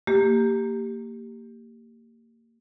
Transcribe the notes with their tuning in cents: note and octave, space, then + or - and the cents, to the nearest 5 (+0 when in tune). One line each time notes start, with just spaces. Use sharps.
A#3 -25 G4 +0